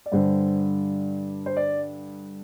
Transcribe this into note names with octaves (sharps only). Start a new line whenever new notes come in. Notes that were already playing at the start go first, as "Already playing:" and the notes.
D5
G2 D3 G3 C5
C5
D5